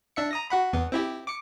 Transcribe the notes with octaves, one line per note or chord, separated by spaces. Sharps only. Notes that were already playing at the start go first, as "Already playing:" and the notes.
D4 E5 C#7
A#5 D#6 A#6
F#4 F#5 B5
E2 B3
C4 E4 G4
D6 C#7